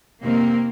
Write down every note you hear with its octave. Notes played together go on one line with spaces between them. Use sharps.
F2 C3 D#3 A#3 C4